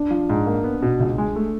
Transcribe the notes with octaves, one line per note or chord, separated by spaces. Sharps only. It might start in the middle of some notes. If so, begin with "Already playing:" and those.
Already playing: D4
F3
G#2
A#3
B3
B2
C#2
G#3
A3